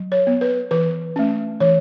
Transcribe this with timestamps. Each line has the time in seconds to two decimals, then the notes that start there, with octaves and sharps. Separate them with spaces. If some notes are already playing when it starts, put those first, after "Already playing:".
Already playing: F#3
0.12 C#5
0.27 B3
0.41 B4
0.71 E3 B4
1.16 A3 C#4
1.60 E3 C#5